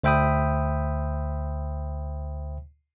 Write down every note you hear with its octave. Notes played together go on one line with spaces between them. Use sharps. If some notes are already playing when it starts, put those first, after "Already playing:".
D2 C5 E5 G5 B5 D#6